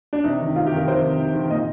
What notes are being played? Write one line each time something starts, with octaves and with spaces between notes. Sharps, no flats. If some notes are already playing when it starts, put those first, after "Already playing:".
D4
C3 D#4
D#3
C3 F4
G4
D#3 A#4
C3 C5
D#3
C3
D#3
A#2 D#5